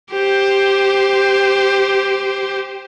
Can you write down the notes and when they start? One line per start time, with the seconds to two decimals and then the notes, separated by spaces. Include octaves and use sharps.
0.12 G4 C5